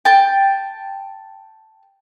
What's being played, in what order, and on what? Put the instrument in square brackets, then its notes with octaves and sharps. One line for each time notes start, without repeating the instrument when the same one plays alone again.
[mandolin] G5 A5